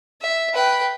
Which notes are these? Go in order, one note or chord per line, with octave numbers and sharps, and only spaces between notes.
E5
B4 G5